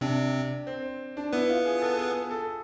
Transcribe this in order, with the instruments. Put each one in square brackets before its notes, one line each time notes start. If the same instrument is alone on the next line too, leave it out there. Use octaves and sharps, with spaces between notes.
[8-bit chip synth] C3 C4 [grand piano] D4
[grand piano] C4
D4
[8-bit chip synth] B3 B4 [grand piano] E4
[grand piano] F4
G#4
A4
G#4
A4